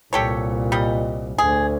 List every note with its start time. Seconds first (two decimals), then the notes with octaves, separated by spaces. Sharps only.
0.13 C2 A#2 G4 A4 C#5
0.72 G3 D#5
1.38 D2 G#4